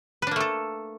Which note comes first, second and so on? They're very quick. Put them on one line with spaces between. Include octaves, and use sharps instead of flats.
B4 D4 A#3 A3 A4